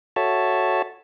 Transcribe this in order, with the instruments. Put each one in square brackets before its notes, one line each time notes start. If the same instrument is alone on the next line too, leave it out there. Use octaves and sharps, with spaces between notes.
[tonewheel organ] F#4 A4 C#5 E5 A5